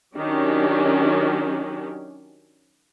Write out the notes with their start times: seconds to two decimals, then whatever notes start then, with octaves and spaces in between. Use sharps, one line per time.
0.16 D#3 F#3 C#4 D4 G4